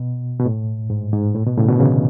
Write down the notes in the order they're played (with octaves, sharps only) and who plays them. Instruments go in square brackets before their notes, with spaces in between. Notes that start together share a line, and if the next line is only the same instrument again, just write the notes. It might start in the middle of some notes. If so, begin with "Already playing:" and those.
Already playing: [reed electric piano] B2
B2
A2
G#2
G#2
A2
B2
A2 C#3
B2 D3
C#3 E3